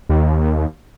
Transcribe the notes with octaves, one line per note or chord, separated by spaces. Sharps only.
D#2